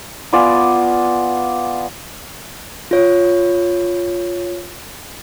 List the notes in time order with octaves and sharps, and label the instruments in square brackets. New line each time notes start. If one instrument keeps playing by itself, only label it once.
[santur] B3 F4 D5 G#5
[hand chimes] F4 C#5